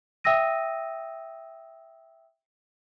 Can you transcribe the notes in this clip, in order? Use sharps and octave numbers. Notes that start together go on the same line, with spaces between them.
E5 G5 D#6 E6 A#6 D#7